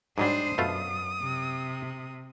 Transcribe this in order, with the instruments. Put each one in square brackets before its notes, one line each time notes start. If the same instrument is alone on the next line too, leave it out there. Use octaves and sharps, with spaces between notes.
[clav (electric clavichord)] G#2 F#3 G3 [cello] D4 C5 [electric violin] D#6
[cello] F#2 [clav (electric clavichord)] B2 A3 F4
[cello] C3